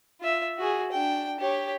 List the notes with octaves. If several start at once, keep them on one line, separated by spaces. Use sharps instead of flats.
F4 E5
F#4 G#4
D4 G5
G4 C#5